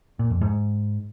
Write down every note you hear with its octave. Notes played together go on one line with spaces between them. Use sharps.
A#2
F2
G#2